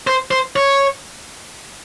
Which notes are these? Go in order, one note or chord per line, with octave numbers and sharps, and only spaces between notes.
C5
C5
C#5